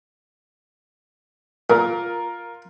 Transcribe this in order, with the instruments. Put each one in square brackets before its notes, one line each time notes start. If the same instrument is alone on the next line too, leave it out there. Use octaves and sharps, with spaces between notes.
[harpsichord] A#2 [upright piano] F4 A#4